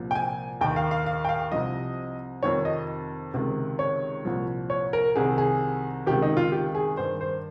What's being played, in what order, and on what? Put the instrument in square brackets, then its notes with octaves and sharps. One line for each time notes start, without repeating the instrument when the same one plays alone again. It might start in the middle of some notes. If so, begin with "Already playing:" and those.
Already playing: [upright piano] C2 A#2 F3
G5
G#5
D#2 D#3 G5
F5
F5
F5
G5
F5
C2 C3 F3 D#5
F2 C3 D#3 C#5
D#5
C#2 C3 D#3
C#5
C2 A#2 F3
C#5
A#4
C2 C3 D#3 G#4
G#4
C#2 C3 D#3 G4
D#4
F4
G4
G#4
G2 D#3 C5
C5